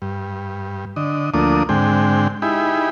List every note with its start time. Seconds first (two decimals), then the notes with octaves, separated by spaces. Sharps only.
0.02 G2
0.96 D3 D#5
1.34 D2 F3 A3 A#3 D4 D#6
1.69 G#2 D3 G#3 C4 G5
2.42 D#4 E4 G4 G#4 B5